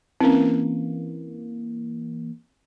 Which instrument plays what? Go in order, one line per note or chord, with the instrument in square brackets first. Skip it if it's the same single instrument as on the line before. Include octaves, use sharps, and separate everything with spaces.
[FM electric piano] E3 A#3 [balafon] C4 C#4